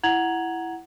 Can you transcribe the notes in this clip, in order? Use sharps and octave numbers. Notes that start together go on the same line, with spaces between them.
E4 F#5 A#5 G#6 F7 F#7